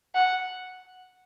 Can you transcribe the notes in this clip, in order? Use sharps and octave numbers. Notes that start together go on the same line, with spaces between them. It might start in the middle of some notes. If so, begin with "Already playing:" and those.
F#5